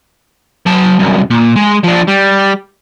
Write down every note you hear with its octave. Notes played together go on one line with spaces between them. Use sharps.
F#3 A5
C2 F#2
A#2
G#3
F3 D4
G3